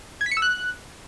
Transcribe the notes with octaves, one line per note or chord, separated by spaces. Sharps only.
G#6
B6
C#7
E6
F#6